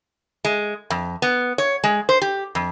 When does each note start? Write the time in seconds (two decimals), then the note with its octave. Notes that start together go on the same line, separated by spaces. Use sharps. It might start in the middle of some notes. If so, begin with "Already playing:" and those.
0.45 G#3
0.90 F2
1.22 B3
1.58 C#5
1.84 G#3
2.09 C5
2.22 G4
2.55 F2